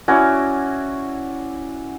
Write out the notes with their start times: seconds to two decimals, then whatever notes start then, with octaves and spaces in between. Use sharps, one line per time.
0.08 C#4 E4 F#4 D5